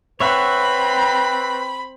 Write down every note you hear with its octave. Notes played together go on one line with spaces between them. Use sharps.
C4 B4 C#5 E5 F#5 B5